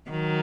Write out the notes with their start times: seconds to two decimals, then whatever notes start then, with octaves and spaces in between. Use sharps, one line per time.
0.10 D#3 F#3